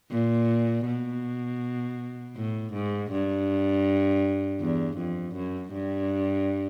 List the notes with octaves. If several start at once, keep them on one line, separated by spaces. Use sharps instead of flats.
A#2
B2
A2
G#2
G2
E2
F2
F#2
G2